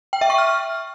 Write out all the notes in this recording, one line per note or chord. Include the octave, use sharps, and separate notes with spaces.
G5
E5
C#6
F6